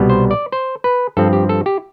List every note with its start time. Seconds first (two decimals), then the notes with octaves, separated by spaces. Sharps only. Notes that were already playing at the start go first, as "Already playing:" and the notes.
Already playing: C2 B2 G3 B3
0.10 C5
0.31 D5
0.52 C5
0.84 B4
1.17 G2 F3 C4 A4
1.33 G4
1.49 A4
1.66 G4